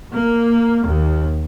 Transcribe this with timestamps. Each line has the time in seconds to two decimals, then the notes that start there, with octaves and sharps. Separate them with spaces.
0.12 A#3
0.85 D#2